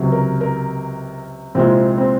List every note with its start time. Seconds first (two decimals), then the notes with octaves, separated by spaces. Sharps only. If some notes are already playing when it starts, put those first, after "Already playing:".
Already playing: C#2 C3 F#3
0.12 A#4
0.41 A#4
1.55 C2 A#2 F3 G#3 C4
1.98 C4